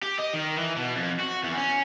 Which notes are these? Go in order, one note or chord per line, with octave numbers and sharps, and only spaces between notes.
G4
D#5
D#3
E3
B2
F2
F#4
E2
C#4